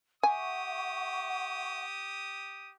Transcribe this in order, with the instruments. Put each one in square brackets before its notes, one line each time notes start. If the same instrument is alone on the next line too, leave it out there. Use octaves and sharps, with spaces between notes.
[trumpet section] G4 D#6 [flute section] E5 F#5 C#6 [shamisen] G#5